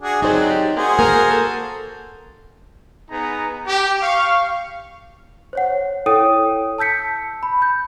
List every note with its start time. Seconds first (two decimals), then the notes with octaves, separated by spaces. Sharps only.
0.01 D4 F#4 G#4
0.22 F#3 C4 D#4 G#4 C5 D5
0.50 G4
0.76 A#3 F#4 G#4 C5
0.99 A#3 A#4 G#5
1.31 A4
3.09 B3 D#4 G#4 A#5
3.67 G4
4.01 F5 C#6
5.53 C5 C#5 F#5
6.06 E4 A4 C#5 G5 D#6 D#7
6.78 A5 E6 G6 B6 C#7
7.43 B5
7.62 G6